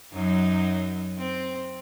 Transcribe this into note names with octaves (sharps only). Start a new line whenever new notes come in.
F#2 F#3 D#4
C4